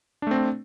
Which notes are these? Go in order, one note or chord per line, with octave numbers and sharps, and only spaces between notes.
A3 C4 D4